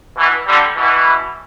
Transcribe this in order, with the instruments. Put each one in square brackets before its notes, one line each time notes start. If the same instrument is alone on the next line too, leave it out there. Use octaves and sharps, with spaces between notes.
[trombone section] B2 E3
D3 G3
B2 E3